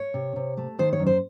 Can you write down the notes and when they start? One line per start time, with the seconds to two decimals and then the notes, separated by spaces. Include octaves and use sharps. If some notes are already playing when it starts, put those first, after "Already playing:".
Already playing: C#5
0.14 C3
0.36 C3
0.57 A3
0.79 D#3 C5
0.93 C#5
0.99 F#2
1.07 C5